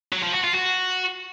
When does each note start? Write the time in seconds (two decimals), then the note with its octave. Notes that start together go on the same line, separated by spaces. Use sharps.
0.13 F#3
0.23 F3
0.34 F#4
0.44 F4
0.55 F#4